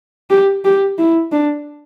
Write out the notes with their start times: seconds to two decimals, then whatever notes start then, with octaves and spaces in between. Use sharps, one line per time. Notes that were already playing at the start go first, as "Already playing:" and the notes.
0.30 G4
0.65 G4
0.98 E4
1.32 D4